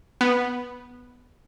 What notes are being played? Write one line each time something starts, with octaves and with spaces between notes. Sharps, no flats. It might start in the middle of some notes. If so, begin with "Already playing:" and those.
B3